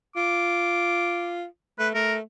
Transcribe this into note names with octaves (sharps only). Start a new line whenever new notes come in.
F4 D6
A3 B4
A3 A#4